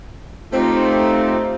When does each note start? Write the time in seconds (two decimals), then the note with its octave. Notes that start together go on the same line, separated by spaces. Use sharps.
0.52 A3 C4 D#4 F4 G4